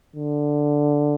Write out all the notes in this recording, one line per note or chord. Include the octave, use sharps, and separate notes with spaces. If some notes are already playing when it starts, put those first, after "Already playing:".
D3